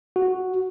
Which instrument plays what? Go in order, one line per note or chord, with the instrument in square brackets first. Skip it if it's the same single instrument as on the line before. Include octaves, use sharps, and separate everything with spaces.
[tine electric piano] F#4